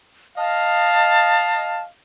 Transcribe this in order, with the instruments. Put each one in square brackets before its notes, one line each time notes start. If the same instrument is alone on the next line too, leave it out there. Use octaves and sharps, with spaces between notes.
[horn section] D#5 F5 [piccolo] A5